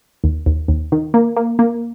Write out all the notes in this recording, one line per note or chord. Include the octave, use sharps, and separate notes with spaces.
D#2
D#2
D#2
D#3
A#3
A#3
A#3